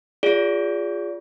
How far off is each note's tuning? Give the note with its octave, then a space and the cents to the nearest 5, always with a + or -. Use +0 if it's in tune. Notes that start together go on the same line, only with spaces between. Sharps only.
F4 +0 G#4 -20 D5 -30